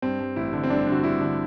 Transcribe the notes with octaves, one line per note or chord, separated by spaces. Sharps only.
G2 C4
G2
A1 E4
D3
C4
G2 D4
D3
F#4
G2 E4
D3